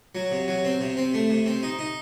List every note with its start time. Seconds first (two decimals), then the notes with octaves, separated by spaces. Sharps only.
0.15 F#3
0.32 C3
0.48 F#3
0.65 C4
0.81 C3
0.97 C4
1.14 A3
1.30 C3
1.46 C4
1.63 D#4
1.79 D#4